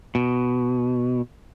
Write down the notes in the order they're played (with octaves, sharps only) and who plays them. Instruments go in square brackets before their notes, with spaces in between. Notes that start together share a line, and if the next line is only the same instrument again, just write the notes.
[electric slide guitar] B2